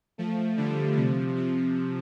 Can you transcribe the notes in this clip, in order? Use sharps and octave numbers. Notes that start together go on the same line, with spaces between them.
F3 A3
D3 G3
C3 F3
C3 F3